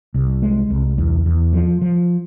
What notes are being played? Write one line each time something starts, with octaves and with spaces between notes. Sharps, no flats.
C2
G#3
C2
E2
E2
F3
F3